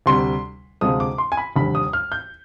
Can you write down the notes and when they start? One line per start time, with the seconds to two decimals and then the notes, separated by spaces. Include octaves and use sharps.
0.06 D2 C3 G3 C6
0.81 D2 C3 F3 G#3 D#6
1.00 D6
1.18 C6
1.32 G#5
1.37 B5
1.56 F1 D#2 D3 G3 B5
1.75 D#6
1.93 F6
2.12 G6